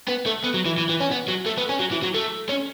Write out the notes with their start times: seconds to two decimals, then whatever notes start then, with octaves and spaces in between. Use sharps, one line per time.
0.09 B3
0.26 A3
0.44 B3
0.54 F#3
0.65 E3
0.78 E3
0.89 E3
1.00 C#4
1.12 B3
1.28 F#3
1.46 A3
1.58 B3
1.69 C#4
1.80 F#3
1.92 E3
2.03 F#3
2.14 A3
2.49 C#4